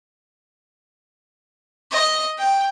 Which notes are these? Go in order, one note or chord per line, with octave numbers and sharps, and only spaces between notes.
D#5
G5